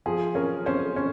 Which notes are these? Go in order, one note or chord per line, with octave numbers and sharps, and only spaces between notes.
F3 G#4
C#4 A#4
C#4 C5
C#4